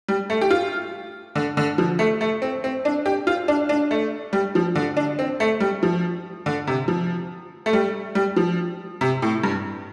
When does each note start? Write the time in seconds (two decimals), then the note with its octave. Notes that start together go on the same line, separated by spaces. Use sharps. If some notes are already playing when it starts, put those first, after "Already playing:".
0.08 G3
0.30 A3
0.41 G4
0.50 F4
1.36 D3
1.57 D3
1.78 F3
1.99 A3
2.21 A3
2.42 C4
2.64 C4
2.85 D4
3.06 G4
3.27 F4
3.48 D4
3.69 D4
3.91 A3
4.33 G3
4.55 F3
4.75 D3
4.97 D4
5.19 C4
5.40 A3
5.60 G3
5.83 F3
6.46 D3
6.67 C3
6.88 F3
7.66 A3
7.73 G3
8.15 G3
8.36 F3
9.01 C3
9.22 A2
9.44 G2